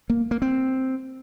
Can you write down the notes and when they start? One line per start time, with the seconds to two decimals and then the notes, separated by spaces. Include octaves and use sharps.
0.10 A#3
0.31 A#3
0.42 C4